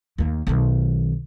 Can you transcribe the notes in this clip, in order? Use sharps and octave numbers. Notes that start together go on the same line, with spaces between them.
D#2 A#3
B1 D#3